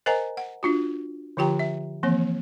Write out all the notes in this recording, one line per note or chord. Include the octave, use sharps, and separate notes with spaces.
A#4 C5 D#5 F#5 G#5 A#5
F#5
D4 F4 F#4
D3 F3 F4 G4 G5 A#5
E5
E3 F3 A#3 C4